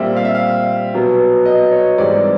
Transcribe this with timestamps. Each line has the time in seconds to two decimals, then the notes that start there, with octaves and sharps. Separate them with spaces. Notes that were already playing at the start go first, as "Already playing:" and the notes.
Already playing: A#2 G3 C4 E5
0.17 F5
0.25 E5
0.35 F5
0.94 B2 F#3 B3
1.45 D#5
1.71 C#5
1.98 G#2 E3 G3 C4 D5